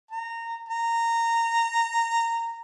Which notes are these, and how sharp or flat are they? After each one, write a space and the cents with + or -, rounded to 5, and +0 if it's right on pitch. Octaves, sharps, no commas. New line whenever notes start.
A#5 -20
A#5 -15